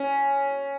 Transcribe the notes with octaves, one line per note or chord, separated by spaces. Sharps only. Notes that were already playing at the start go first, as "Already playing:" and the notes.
Already playing: C#4